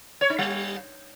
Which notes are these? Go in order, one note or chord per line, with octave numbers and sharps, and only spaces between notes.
C#5
D#4
G3